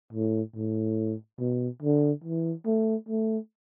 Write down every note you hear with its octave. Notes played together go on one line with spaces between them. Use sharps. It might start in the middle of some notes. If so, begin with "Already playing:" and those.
A2
A2
B2
D3
E3
A3
A3